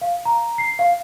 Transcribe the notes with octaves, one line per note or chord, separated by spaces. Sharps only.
F5
A#5
C7
F5